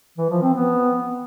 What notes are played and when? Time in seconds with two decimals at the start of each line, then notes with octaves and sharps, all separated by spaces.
0.18 E3
0.30 F3
0.42 C4
0.54 B3